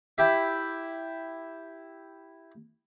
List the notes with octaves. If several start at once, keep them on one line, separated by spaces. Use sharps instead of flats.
E4 G4 E5